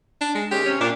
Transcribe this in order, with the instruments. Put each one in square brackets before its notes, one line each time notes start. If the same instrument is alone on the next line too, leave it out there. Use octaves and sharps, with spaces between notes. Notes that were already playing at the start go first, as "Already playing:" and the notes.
[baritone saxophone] D4
G#3
[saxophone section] D#2 G#3 C#4 [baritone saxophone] G4
[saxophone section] C3 C#4
[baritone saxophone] A#2 [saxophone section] D4